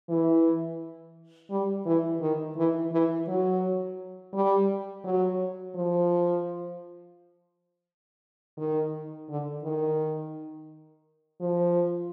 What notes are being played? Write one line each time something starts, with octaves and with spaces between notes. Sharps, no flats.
E3
G3
E3
D#3
E3
E3
F#3
G3
F#3
F3
D#3
D3
D#3
F3